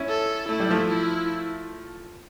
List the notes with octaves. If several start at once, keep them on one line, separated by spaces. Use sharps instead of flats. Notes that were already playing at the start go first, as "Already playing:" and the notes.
Already playing: C#4 E4
A4
A3 E4
G3
F3 A3
E4